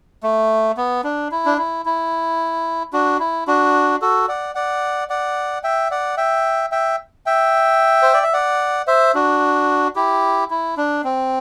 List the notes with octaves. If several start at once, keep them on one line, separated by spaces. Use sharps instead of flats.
A3
B3
D4
E4
D4
E4
E4
D4 F#4
E4
D4 F#4
F#4 A4
D5 F#5
D5 F#5
D5 F#5
E5 G5
D5 F#5
E5 G5
E5 G5
E5 G5
C5
D5
E5
D5 F#5
C5 E5
D4 F#4
E4 G4
E4
D4
C4